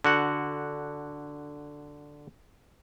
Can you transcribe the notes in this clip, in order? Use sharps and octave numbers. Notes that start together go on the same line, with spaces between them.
D3 F#4 F#5